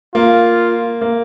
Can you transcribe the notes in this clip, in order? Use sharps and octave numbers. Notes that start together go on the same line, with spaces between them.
A#3 F4
A#3